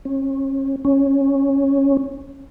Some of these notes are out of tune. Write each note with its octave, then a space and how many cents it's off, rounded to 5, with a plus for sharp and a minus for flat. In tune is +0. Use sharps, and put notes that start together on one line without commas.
C#4 -35
C#4 -10